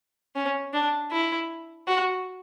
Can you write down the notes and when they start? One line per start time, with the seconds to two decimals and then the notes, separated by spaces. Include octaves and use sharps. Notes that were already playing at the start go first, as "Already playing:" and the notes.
0.36 C#4
0.73 D4
1.12 E4
1.87 F#4